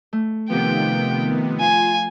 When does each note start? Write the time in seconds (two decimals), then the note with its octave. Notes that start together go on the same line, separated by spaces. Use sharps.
0.13 A3
0.49 C3 D#3 F3 B3 G4 G5
1.60 F4 G#5